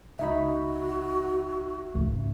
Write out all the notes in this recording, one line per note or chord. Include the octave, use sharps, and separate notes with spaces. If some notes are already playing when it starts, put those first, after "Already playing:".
C#2 D#4 F#4 E5 B5
G#2 C#3